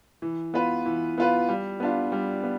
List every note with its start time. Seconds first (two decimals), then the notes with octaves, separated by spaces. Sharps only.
0.22 E3
0.54 B3 F4 B4
0.86 E3
1.18 B3 F4 B4
1.49 G3
1.80 B3 D4 F4
2.12 G3
2.43 B3